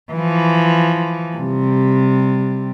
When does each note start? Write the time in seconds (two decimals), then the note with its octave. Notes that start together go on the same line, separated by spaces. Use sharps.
0.12 E3 F3
1.37 C3 G3